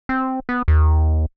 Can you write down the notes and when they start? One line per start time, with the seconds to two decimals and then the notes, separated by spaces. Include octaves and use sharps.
0.09 C4
0.49 B3
0.68 D#2